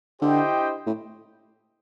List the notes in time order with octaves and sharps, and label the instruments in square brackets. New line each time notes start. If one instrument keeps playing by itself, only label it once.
[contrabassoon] D3 [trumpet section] E4 G4 C5 D#5 G5
[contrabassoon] A2